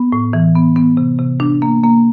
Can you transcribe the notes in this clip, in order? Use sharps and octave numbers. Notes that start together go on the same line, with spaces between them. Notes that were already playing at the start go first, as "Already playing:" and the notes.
Already playing: B3
A2
E3
B3
B3
C3
C3
D4
A#3
A#3